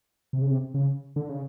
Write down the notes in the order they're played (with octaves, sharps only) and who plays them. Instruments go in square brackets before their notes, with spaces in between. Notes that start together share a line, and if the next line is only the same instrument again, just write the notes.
[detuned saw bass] C3
C#3
C3
C#3
D3
C#3